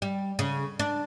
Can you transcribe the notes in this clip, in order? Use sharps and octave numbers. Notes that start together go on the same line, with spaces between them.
G3
C#3
D4